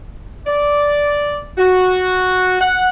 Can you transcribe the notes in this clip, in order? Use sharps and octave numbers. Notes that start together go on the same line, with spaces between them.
D5
F#4
F#5